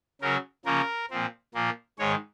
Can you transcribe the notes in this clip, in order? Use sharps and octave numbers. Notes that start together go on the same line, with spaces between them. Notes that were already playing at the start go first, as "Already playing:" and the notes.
C#3 F#3 C#4 A#4
C#3 F3 A#3 C#4 A#4
A#2 F3 C4
A#2 F3 A#3
G#2 D#3 G#3 C#5